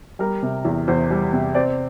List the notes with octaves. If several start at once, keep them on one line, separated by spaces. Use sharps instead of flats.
G3 A#4
C3
E2
E2 C5
G3
C3
C4 D5